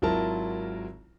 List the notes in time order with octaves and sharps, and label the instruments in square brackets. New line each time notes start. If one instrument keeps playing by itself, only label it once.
[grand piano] G#1 F#3 E4 F4 A#4 A5